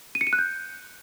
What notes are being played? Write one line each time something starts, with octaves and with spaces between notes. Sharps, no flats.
D#7
C#7
D#7
F#6
G6